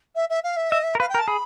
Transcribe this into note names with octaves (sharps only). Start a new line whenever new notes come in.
E5
E5
F5
E5
D#5 E5
E5
A#4
B4 F5
G5
A#4
A5
G#4 B5